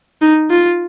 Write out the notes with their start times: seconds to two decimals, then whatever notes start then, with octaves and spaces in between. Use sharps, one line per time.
0.22 D#4
0.51 F4